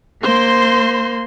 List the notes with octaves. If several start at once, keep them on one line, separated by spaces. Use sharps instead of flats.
A#3 C5 C6